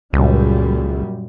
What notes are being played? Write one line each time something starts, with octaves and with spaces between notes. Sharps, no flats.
C#2 F#2 A#2 G3